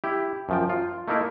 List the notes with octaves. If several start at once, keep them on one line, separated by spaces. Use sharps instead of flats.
E4 G4
F#2 F3 G5
F4
A3 A#3 D#4 E4 A#4